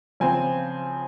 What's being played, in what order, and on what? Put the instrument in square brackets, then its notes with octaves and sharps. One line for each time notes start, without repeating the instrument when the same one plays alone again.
[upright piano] C#3 F3 C4 G#5